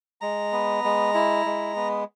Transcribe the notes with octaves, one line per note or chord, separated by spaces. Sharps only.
G#3 A#5
B3
G#3
E4
G#3
B3